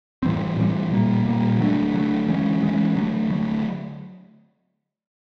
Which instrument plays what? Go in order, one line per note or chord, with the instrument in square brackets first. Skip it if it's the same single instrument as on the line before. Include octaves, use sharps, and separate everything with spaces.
[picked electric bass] A2 E3 G3 C4
A2 E3 G3 C4
A#2 G3 A#3
A#2 G3 A#3
D3 F#3 A3 D4
D3 F#3 A3 D4
E3 G#3 C#4
E3 G#3 C#4
D3 F#3 A3
D3 F#3 A3